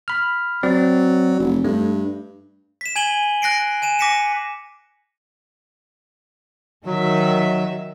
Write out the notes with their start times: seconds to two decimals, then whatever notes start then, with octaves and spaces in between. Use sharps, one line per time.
0.08 B5 F6
0.63 F#3 C4 D5
1.39 F1
1.64 G2 A3
2.81 B6 E7
2.96 G#5 G#6 D#7 F#7 G7
3.42 F#6 A#6 C7 D7
3.82 G#5 D#7 E7
3.99 D6 A#6 B6 C#7 E7
6.86 D#3 F#3 E5